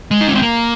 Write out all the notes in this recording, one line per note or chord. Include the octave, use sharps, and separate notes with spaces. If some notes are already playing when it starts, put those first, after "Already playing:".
G#3
D#4
C#4
C4
A#3